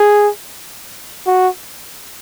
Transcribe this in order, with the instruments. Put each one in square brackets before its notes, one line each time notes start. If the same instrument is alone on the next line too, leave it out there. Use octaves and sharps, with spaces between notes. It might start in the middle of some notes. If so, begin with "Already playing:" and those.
Already playing: [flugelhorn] G#4
F#4